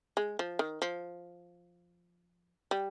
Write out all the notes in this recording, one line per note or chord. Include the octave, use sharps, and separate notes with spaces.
G#3
F3
D#3
F3
G3